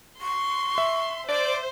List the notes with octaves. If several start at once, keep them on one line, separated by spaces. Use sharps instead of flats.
C6 C#6
E5
C5 D5